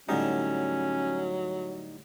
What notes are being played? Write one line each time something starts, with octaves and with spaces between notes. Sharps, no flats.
A2 D3 F#3 G3 C#4 D#4